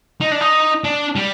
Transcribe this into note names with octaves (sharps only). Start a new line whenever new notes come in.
D#4
D4
D#4
D4
G3